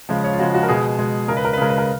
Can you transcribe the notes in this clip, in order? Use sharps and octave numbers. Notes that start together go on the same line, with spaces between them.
C#3 F3 G#3
C#5
F4
C#3 F3 G#3 F#4
F#4
A#4
B2 G#3 G#4
B2 G#3
C#3 G#3 A#4
B4
A#4
B4
C#3 G#3 A#4
B4
A#4